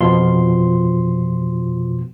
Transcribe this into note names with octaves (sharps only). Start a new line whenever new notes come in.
F2 B2 F3 F4 C6